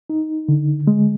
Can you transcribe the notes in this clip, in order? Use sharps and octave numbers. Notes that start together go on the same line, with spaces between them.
D#4
D3
G#3